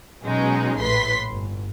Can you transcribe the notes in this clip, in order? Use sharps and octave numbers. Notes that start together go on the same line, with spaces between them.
B2 F#3 G#3 C#4 D#4
A#1 A2 B4 C6 B6
G1